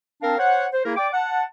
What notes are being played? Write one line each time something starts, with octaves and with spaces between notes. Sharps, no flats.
C4 D4 A#4 F5 A5
C5 C#5 F#5
C5
A#3 E4 G#4 A#4
D5 G5 D6
F#5 A5